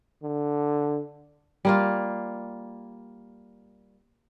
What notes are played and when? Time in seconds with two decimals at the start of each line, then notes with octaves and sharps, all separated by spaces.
0.23 D3
1.65 G3 A#3 F4